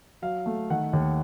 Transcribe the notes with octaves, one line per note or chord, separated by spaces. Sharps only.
F#3 F5
A3
D#3 F#5
D#2